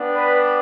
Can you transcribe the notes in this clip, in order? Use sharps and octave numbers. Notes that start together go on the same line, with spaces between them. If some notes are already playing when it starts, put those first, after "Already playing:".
Already playing: B3 D4 G4
B4 D5